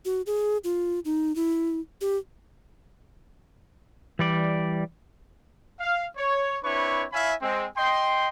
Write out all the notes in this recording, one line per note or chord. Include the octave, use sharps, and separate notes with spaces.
F#4
G#4
F4
D#4
E4
G4
E3 G3 D5
F5
C#5
C4 D4 E4 B4 C#5 C#6
E4 C#5 E5 F5 G#5 B5
G#3 C4
D#5 G5 C6